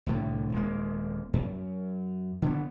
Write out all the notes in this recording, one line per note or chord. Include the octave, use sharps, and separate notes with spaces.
C2 A2 D3
D#1 G#3 A#3
F#2
D3 B3